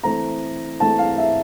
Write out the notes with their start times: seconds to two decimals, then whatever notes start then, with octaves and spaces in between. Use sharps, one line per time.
0.04 E3 A3 C4 A#5
0.80 E3 A3 C4 A5
0.99 F5
1.18 E5